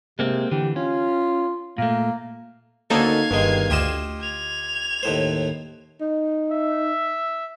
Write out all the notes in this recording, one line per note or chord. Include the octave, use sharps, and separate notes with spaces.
C3 G#3 A#3 C4
D3 E3 G4
C#4 F4
A#2 A3 A#3
D2 A#3 C#4 D#4 A4 F5 G#6
G1 G2 D#3 G#3
D2 F4 G4 D#5 E7
G#6 F7
D#2 A2 C5
D#4
E5